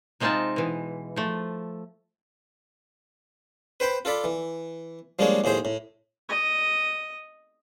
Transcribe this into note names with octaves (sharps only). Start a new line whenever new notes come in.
C3 G#3 C4 D#4 F4 A5
B2 E3
F3 A3
B4 C5 G5 B5
F4 A4 D5 B5
E3
F3 G3 G#3 A#3 D4 C#5
D#2 A2 G#4 C5 C6
A2
D#5